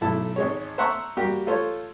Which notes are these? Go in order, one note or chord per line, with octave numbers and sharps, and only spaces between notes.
B1 A3 E4 A5
G#1 G#3 C#5
C5 E5 F#5 A5 A#5 C#6
G3 A#3 F#4 G4
A3 F4 A4 C5 C#5